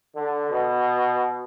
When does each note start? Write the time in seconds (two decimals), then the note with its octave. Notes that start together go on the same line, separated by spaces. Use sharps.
0.16 D3
0.50 B2